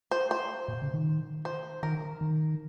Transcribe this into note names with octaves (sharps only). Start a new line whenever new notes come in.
C5
C5
A#2
C#3
D#3
C5
D#3 A#4
D#3